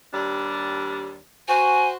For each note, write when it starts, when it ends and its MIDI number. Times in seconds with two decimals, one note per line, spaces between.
0.13 1.17 39
0.13 1.17 55
0.13 1.17 62
1.48 1.96 66
1.48 1.96 72
1.48 1.88 80